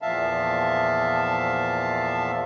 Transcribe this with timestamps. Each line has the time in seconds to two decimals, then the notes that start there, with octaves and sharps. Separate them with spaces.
0.02 E2 A#2 F3 E5 F5 A5